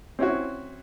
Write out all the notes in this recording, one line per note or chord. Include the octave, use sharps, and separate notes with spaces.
C4 C#4 E4 F#4